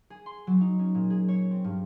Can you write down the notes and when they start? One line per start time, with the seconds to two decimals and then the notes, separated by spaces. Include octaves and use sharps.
0.10 G#4
0.26 C6
0.47 F#3
0.61 D#4
0.79 C#4
0.94 A#2
1.10 G#4
1.29 C#5
1.51 C4
1.64 G2